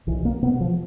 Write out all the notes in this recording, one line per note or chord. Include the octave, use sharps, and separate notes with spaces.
B1 E3
A#3
B2 B3
F3